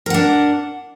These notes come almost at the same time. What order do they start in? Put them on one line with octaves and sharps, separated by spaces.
A#4 F#5 D4